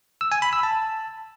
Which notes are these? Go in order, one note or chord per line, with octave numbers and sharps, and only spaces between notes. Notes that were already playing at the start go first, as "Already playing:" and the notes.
E6
G#5
B5
E6
A5